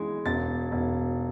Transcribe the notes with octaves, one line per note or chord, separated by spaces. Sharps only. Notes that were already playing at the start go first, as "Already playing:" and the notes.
Already playing: E3 G#3 G#6
E1 A6
E1